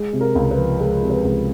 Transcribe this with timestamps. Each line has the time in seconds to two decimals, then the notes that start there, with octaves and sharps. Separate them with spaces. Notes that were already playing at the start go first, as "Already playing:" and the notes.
Already playing: G#3
0.13 C3
0.21 A#4
0.35 C#2
0.51 B4
0.58 F3
0.80 G#3 A#4
1.03 C3
1.10 B4
1.25 C#2